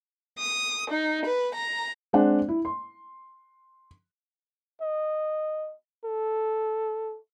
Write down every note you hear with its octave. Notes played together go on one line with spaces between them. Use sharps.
D#6
D#4
B4
A#5
G#3 C4 D4 F#5
E4
C6
D#5
A4